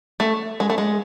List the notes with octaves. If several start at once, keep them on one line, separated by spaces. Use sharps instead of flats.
A3
G#3
A3
G#3